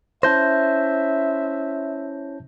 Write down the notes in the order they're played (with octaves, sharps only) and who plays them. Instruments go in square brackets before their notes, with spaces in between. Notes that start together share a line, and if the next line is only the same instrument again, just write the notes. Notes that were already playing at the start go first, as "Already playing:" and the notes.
[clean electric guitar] C#4 E4 C5 [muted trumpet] E5 [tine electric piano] A5 G6 A#6